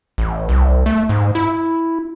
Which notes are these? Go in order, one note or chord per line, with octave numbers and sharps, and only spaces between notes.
A1
C2
A3
G#2
E4